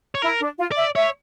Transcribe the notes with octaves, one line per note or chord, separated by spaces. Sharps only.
C#5
E4 A#4
D4
F4
D5
E5
C#5 E5